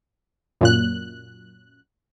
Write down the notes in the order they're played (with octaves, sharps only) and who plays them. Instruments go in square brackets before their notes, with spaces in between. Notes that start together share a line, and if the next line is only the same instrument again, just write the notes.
[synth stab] F#2 A#2 F#6